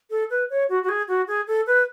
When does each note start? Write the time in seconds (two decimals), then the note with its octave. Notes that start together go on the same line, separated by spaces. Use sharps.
0.10 A4
0.30 B4
0.50 C#5
0.69 F#4
0.83 F#4
0.89 G#4
1.08 F#4
1.27 G#4
1.47 A4
1.67 B4